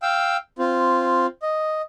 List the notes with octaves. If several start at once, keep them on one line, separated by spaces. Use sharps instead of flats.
F5 G5 E6
C4 F4
D#5